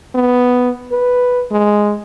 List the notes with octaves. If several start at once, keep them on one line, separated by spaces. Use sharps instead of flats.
B3
B4
G#3